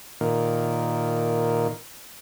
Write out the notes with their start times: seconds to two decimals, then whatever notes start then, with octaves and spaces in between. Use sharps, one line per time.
0.21 A#2 D#3